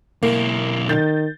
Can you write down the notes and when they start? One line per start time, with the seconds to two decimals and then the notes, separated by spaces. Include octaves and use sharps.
0.23 B1 A#3 E4
0.89 D#3 G6 A6